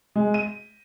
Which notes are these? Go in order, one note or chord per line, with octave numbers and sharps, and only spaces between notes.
G#3
D#7